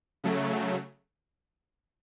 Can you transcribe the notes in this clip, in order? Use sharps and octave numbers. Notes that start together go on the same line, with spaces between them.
C#3 F#3 A3